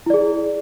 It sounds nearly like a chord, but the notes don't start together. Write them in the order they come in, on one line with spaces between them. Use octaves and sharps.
E4 D5 G#4